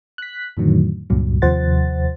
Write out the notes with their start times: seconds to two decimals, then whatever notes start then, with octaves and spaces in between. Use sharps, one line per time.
0.18 F#6 B6
0.57 F2 A2 D3 D#3 F#3
1.10 C#2 G2 A#2 F#3
1.42 D#2 C3 F3 C5 F#5 A6